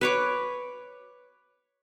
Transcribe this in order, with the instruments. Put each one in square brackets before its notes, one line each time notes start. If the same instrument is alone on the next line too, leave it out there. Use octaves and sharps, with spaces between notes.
[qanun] B4 C#5 D6